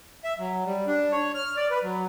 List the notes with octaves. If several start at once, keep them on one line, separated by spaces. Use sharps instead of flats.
E5
F#3
G3
D4
C#5
F6
D5
B4
F#3